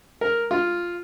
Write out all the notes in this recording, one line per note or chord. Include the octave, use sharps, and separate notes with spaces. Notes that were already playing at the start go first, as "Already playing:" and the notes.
A#4
F4